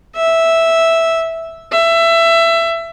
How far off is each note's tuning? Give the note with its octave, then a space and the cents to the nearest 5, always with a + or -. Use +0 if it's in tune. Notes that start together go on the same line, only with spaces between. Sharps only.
E5 -5
E5 +20